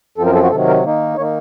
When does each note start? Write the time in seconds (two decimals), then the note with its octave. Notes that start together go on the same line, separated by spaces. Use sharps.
0.18 F#2 F3 C4 A4
0.26 A#4
0.35 A4
0.43 F#4
0.51 C3 D#3 F#3 A4
0.67 A#4
0.84 D#3 A#3 D#4
1.17 D#3 A#3 D#4 C#5